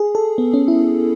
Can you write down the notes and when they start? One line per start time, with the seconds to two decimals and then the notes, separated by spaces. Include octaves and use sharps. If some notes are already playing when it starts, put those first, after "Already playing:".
Already playing: G#4
0.15 A4
0.38 B3
0.54 C#4
0.68 E4